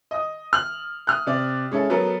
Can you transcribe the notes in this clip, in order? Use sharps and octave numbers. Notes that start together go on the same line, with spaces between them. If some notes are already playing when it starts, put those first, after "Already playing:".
D#5 D#6
F6 F#7
D#6 F6 F#6
C3 D5
G#3 C#4 E4 A4
F#3 B3 A4 A#4